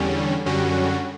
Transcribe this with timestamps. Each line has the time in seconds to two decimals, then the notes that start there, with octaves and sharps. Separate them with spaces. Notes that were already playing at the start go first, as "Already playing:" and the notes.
Already playing: E2 D3 G3 C#4
0.46 F#2 D3 G3 C#4 F#4